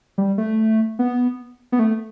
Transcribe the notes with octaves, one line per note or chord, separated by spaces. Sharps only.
G3
A3
B3
B3
A3